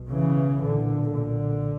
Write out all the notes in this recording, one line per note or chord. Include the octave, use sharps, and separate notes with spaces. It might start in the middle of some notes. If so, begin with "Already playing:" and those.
Already playing: B1 B2
C#3 E3
B1 A#2 D3
D3